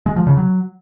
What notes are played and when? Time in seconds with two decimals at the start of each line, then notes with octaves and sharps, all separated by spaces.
0.06 G#3
0.16 F3
0.27 C#3
0.37 F#3